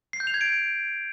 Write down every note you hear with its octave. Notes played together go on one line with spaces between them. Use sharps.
C7
G6
F7
G#6
D7